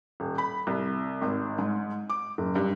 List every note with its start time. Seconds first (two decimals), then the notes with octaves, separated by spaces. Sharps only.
0.20 D#1
0.38 B5
0.67 C2
1.22 G#1
1.59 G#2
2.10 D6
2.38 F#1
2.55 G2